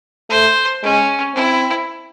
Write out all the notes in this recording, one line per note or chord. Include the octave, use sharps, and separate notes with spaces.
A3 C5
G#3 C#4
C4 E4